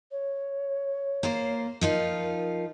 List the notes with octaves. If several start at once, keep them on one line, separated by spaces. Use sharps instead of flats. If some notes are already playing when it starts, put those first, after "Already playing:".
C#5
A#3 F4 C5
F3 D#4 F4 A#4